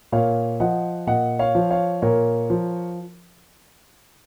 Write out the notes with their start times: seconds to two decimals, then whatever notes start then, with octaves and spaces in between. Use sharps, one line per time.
0.12 A#2 C#5 F5
0.60 F3 D#5 F#5
1.07 A#2 D#5 F#5
1.39 C#5 F5
1.55 F3
1.70 C#5 F5
2.02 A#2 A#4 C#5
2.50 F3